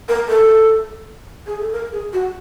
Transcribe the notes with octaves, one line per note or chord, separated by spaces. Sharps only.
A#4
A4
G#4
A4
A#4
G#4
F#4